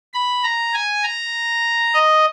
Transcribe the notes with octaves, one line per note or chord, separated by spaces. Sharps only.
B5
A#5
G#5
A#5
D#5